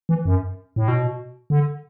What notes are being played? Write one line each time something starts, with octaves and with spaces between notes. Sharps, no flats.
E3
F#2
A2
B2
D3